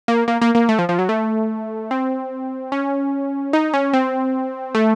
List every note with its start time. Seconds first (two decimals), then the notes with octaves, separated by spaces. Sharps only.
0.08 A#3
0.28 A#3
0.42 A#3
0.55 A#3
0.69 A3
0.79 F3
0.89 F3
0.99 F#3
1.09 A3
1.91 C4
2.72 C#4
3.53 D#4
3.74 C#4
3.93 C4
4.75 A3